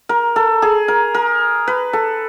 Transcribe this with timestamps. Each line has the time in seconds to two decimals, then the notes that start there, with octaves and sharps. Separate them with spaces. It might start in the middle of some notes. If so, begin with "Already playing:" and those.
0.09 A#4
0.36 A4
0.62 G#4
0.88 A#4
1.15 A#4
1.67 B4
1.93 A4